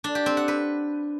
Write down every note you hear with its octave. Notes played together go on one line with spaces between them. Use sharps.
D4
G4
C4
F#5
B4